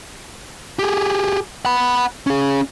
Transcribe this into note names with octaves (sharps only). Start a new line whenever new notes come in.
G4 G#4
F#5 B5
C#4 G#4